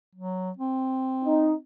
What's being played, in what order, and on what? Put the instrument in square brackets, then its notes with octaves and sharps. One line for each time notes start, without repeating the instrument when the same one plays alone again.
[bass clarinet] F#3
C4
[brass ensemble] D#4